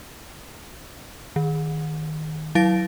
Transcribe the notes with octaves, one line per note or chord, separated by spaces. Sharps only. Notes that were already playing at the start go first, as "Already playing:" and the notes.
D#3
F#3 E4 F5 A6 A#6 D7